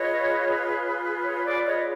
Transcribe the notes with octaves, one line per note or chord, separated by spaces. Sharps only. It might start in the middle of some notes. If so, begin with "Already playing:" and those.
Already playing: F4 G#4 B4 C#5 D#5
C#5
D5
C#5 D#5